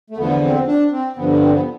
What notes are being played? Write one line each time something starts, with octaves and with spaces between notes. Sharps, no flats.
A3
E2 D3 F3 B3
C4
D4
C4
G2 D3 F3 B3
B3
C4
B3